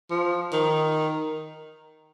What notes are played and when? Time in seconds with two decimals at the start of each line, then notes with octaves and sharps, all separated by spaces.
0.10 F3
0.53 D#3